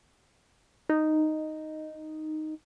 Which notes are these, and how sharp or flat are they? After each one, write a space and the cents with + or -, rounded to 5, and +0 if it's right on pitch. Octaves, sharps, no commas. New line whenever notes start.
D#4 -5